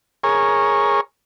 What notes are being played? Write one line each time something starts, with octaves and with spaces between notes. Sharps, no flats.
G#4 A#4 C#5